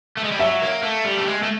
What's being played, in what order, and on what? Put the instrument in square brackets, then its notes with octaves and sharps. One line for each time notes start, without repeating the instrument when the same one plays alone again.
[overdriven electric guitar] A3
G#3
G3
[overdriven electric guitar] F#3 [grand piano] E5
[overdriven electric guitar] A#3
A3
G3
A3
G#3
A3